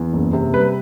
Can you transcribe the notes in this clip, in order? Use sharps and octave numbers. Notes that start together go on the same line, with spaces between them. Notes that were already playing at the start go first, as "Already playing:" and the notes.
Already playing: E2
F#1
C3
G3 B4